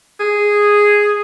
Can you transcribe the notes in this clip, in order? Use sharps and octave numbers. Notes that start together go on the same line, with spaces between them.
G#4